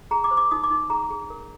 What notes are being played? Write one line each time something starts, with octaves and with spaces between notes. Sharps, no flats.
G#4 A#5
D6
C5
D6
D#4 D#6
D6
D#4
G#4 A#5
G#4
A#4